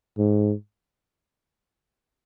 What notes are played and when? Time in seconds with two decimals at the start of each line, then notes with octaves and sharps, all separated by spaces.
0.18 G#2